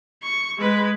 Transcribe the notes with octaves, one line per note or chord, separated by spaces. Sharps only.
C#6
G#3 B4